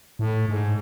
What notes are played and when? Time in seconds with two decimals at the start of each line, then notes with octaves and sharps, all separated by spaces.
0.19 A2
0.49 G#2